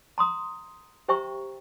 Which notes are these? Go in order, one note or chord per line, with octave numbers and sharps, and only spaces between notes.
A#5 C6 D#6
G4 C5 E5 G5 A#5 C#6